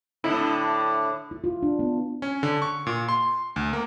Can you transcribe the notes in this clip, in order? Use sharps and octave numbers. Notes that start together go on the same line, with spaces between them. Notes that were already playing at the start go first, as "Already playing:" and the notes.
A2 D3 E4
E4
F4
D4
B3
C#4
D3
C#6
A#2
C6
D2
A#3